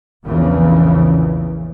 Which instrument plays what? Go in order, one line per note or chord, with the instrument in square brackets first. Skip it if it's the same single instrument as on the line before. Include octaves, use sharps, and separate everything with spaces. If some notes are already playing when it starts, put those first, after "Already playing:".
[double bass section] A#1 E2 C#3 E3